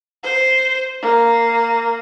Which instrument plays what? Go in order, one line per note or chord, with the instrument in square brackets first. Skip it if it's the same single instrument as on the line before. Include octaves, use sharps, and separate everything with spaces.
[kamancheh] C5
A#3